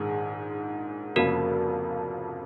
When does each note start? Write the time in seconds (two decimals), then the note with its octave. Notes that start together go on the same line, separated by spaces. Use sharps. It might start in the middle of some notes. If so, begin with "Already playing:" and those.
Already playing: A#1 G#2 D#3 G#3 G#4
1.16 F1 F2 C#3 F3 A#3 F#4 A#4